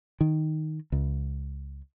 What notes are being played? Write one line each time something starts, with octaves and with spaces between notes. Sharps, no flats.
D#3
C#2